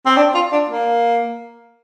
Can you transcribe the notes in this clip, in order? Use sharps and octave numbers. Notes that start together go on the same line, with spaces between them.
C4
D4
F4
D4
A#3